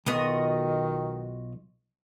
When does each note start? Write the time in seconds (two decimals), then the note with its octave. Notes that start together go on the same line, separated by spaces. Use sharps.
0.06 B1 D#3 B3 F4 F#4 D#5